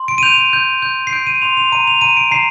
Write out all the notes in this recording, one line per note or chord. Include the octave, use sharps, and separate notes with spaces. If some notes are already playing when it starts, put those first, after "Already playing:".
Already playing: C6
D7
D#7
G6 F7
D#7
G6
G6
C7
G6 D7
D#7
C6 F7
F7
A#5 D#7
F7
A#5 D#7
D7
A#5 C7